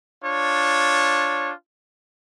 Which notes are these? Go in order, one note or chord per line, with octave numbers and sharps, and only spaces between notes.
D4 F4 C#5